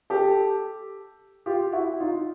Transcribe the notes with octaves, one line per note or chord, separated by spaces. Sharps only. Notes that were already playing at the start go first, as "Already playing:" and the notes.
G4 A4
F4 G4
E4 F#4
D#4 F4